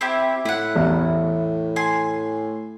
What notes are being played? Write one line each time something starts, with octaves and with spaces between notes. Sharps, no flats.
C4 E4 G4
A2 E4 F#5
A1 E2
G#5 C6